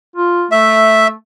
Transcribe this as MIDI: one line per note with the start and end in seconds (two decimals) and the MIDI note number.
0.16 0.46 65
0.52 1.13 57
0.52 1.07 76